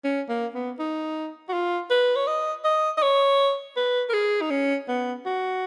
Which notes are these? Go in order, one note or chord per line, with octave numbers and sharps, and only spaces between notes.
C#4
A#3
B3
D#4
F#4
F4
B4
C#5
D#5
D#5
D#5
C#5
B4
A#4
G#4
D#4
C#4
B3
F#4